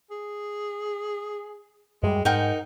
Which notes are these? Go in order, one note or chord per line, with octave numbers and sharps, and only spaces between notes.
G#4
F#2 G3 G#3
G#2 D#4 A#4 F#5 G5